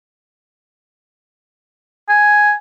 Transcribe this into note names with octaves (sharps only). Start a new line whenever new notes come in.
G#5